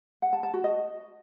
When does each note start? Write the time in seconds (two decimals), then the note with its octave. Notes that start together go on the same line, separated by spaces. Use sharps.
0.22 F#5
0.33 A5
0.43 A5
0.54 F#4
0.64 D#5